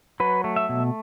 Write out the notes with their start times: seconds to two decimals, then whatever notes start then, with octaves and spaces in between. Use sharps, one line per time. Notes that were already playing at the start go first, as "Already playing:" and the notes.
0.20 F#3 B4
0.44 A3
0.56 E5
0.69 B2